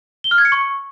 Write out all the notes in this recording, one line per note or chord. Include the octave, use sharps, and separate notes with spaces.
G7
F6
G#6
C#7
C#6